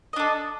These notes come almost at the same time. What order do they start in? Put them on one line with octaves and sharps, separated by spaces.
D#5 D4 A4